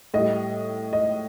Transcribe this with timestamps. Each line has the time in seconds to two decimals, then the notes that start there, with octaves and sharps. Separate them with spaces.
0.14 A2 G3 D#5
0.93 D#5